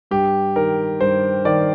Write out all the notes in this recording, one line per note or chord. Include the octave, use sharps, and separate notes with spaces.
G2 G4
D#3 A#4
G2 C5
D#3 D5